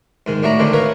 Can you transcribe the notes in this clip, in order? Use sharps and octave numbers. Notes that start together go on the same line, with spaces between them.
G#2 D#3 G#3
A2 D4 E4 F#4 E5 A#5
D3 D#3 G#3 A3 C4 D4
A#4 B4 C#5 E5 F5